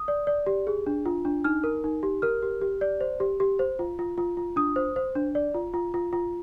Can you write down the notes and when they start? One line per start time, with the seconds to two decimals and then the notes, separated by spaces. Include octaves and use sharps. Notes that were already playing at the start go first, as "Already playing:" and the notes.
Already playing: D#6
0.08 D5
0.27 D5
0.46 G4
0.67 G#4
0.87 D4
1.05 F4
1.25 D4
1.44 D#4 F6
1.64 A#4
1.84 D#4
2.03 G4
2.22 A#4 F6
2.42 G4
2.61 G4
2.81 D5
3.01 C5
3.20 G4
3.40 G4
3.59 C5
3.79 F4
3.99 F4
4.18 F4
4.37 F4
4.56 D4 D#6
4.76 C5
4.96 C5
5.15 D4
5.35 D5
5.54 F4
5.74 F4
5.94 F4
6.13 F4